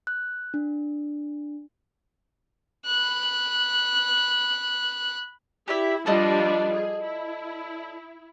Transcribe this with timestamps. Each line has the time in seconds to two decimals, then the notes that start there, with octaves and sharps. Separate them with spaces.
0.07 F#6
0.54 D4
2.86 B5 F#6
5.68 E4 G4 D5 E5
6.06 F3 G3 D4 A4 D5 D#5
6.73 G#4
7.03 E4